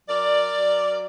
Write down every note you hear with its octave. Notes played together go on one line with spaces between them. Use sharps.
F#3 A#4 D5
F#3